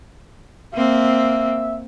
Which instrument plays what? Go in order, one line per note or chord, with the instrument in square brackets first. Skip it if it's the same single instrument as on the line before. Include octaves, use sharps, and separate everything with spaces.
[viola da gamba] A#3 C4 [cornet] E5